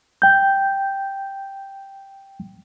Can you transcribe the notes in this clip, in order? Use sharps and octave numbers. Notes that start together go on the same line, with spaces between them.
G5 G6